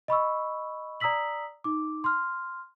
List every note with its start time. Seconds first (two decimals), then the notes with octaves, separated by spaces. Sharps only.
0.08 D#5 B5 C#6 E6
1.00 D5 A#5 D#6 E6 B6 F#7
1.64 D#4 D6
2.04 C6 F6